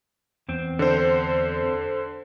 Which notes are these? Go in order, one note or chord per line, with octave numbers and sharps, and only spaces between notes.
E2 C4
D3 C5